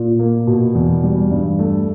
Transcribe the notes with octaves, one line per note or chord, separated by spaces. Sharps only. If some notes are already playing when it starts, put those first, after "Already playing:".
Already playing: A#2
A#3
B2
E2
G3
G2
A3